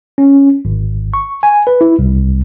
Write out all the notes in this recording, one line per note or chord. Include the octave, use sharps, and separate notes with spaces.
C#4
G#1
C#6
G#5
B4
E4
C2